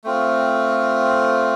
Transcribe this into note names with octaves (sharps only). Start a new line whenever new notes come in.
A3 C4 F4